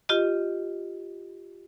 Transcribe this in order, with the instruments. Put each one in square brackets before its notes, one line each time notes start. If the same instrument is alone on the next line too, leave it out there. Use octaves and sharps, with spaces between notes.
[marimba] F4 G4 D#5